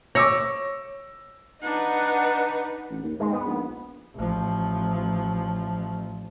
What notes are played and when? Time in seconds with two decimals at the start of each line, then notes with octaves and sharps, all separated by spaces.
0.15 C#5 D6 E6 A#6
1.62 D4 D#4 B4 F#5
2.90 A1
3.03 D#2
3.20 G#2 G#3
3.33 B3
3.45 A#1
4.15 A1 F3